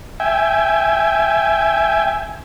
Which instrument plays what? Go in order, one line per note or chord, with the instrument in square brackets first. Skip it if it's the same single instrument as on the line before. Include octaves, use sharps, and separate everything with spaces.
[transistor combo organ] E5 G5 G#5